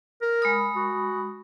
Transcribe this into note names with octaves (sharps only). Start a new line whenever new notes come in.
A#4
G#3 B5 D#6
F#4